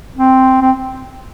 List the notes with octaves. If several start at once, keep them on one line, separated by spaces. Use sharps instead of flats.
C4
C4